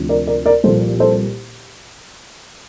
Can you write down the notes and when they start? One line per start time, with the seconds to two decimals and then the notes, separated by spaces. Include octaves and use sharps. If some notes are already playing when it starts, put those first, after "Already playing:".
Already playing: D2 C3 F3
0.09 A#4 D5
0.27 A#4 D5
0.45 A#4 D5
0.64 C2 A#2 F3 A4 C5
1.00 A4 C5